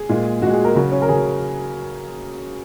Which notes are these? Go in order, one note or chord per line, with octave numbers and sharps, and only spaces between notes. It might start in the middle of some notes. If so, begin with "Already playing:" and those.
Already playing: G#4
A#2 G#3
A#2 G#3 F#4
G#4
A#4
C#3 F#3 F#4
C#4
A#4
C#3 F#3 G#4